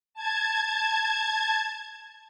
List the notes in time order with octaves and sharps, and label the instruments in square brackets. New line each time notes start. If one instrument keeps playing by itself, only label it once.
[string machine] A5 G#6